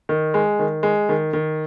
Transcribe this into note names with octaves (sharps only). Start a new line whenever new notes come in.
D#3
G#3
D#3
G#3
D#3
D#3